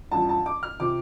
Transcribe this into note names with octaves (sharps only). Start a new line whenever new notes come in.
A1 G2 F3 A5
A5
D6
F6
C3 F3 D6